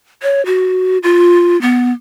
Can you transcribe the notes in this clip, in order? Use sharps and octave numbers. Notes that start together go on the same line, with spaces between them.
C#5
F#4
F4
B3